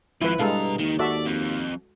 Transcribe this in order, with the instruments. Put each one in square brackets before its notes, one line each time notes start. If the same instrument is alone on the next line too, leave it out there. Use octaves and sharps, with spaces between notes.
[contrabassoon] G#1 [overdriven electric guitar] F3 [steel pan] E4 B4
[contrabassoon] G2 [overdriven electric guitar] B2 A#5 [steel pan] G#3 A4 F5
[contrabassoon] D#2 [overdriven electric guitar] D#3
[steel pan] F#4 A4 E5 [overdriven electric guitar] D5
[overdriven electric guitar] F2